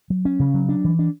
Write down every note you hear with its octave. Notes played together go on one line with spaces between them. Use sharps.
F#3
C#4
C#3
F#3
D4
E3
D4